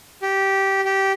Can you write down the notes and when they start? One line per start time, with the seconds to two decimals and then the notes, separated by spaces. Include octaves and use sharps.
0.22 G4
0.85 G4